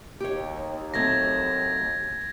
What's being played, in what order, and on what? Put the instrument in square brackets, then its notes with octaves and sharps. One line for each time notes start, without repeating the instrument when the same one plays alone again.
[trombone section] D#2 [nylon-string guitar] G4 C#5
[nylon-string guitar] F#3 A3 C4 [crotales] G#6 A#6